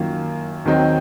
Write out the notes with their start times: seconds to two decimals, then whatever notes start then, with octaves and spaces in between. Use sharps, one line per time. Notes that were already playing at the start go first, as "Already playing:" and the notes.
Already playing: F#2 D#3 A#3 F4
0.65 D#2 D#3 F#3 C4 D#4